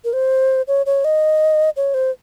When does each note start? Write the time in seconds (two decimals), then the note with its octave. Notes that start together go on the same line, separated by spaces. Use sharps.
0.05 A#4
0.13 C5
0.68 C#5
0.86 C#5
1.05 D#5
1.77 C#5
1.94 C5